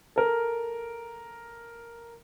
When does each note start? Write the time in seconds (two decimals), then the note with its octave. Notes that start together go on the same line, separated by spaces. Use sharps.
0.16 A4 A#4